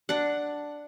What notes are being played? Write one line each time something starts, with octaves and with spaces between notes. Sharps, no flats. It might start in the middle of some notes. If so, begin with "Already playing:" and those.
D4 F#5